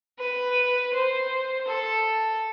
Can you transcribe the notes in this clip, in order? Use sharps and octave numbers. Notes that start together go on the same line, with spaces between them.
B4
C5
A4